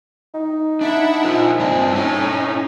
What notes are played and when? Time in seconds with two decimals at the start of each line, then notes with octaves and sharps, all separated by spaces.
0.34 D#4
0.81 D4 E4 E5 F#5
1.24 F4 A#4 C5
1.59 G2 C4 D4 C5
1.92 C#4 D#4 E4 C#5